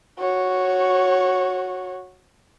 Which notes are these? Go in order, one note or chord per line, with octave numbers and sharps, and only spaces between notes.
F#4 C#5